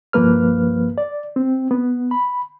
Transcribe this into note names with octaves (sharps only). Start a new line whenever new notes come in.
C2 G2 F3 A#3 B4 F6
D5
C4
B3
B5